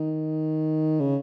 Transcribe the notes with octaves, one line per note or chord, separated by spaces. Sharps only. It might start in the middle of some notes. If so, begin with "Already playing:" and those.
Already playing: D#3
C#3